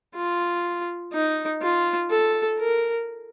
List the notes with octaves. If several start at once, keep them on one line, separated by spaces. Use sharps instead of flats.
F4
D#4
F4
A4
A#4